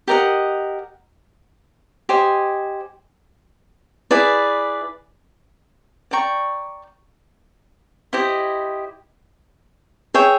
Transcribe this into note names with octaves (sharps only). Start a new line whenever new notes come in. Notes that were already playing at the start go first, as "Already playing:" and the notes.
G4 A#4 D#5 F#5
G4 C5 D#5 G#5
E4 G#4 B4 D5
D5 G5 A#5 C#6
E4 G4 C5 D#5
G#4 C#5 E5 G5